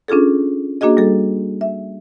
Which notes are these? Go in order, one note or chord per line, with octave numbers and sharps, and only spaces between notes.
C#4 D4 F4 G#4 A4
A#3 D4 F#4 G#4 D#5
G3 A4
E5